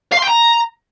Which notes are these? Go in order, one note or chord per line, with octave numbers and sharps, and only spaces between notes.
F5
C6
G5
A#5